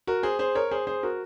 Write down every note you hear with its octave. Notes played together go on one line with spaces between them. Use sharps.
F#4 A#4
G#4 C5
G#4 C5
A#4 C#5
G#4 C5
G#4 C5
F#4 A#4